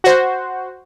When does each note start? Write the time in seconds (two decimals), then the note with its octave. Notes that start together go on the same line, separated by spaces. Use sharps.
0.04 F#4 C5